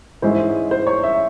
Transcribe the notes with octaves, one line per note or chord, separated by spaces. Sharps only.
G#2 E3 G#3 C#4 E4 C5
C5
C#5
E5